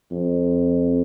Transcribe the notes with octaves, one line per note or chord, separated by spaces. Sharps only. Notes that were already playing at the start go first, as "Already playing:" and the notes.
F2